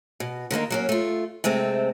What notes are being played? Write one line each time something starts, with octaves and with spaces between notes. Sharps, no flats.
B2
D3 D#3 A#3 D#4
F#3 A#3 C#4
A3 F4
C3 G#3 A3 C4